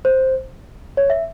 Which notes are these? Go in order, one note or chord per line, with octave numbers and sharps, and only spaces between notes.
C5
C#5
E5